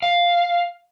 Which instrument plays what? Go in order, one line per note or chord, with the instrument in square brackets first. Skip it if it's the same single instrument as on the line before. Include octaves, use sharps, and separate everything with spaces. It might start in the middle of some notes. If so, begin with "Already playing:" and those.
[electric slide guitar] F5